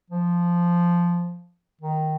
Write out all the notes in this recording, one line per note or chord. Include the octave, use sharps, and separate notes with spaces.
F3
D#3